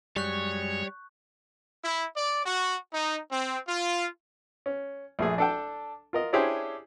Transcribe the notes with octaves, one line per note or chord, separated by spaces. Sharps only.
F#2 G3 G#3 C#5 C#6 F#6 G6
E4
D5
F#4
D#4
C4
F4
C#4
A#1 A3 G#4
D4 A4 G5
F4 A#4 D#5
C#4 D4 E4 G4 G#4 C5